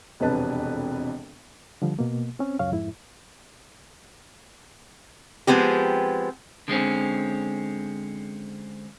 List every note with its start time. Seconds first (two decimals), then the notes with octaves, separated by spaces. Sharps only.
0.20 E1 F2 C3 D4 B4 A5
1.82 D3 F3 G3
1.99 B2 A#3
2.39 C4 C#4
2.59 C#2 F#2 C#5 F5
2.72 F2 G#2 E4
5.47 F3 G#3 B3 C4 G4
6.68 D3 G#3 C4 C#4